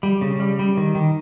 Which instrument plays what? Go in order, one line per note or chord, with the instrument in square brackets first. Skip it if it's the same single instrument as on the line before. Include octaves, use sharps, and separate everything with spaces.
[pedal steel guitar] G3
C#3
G3
G3
D#3
D#3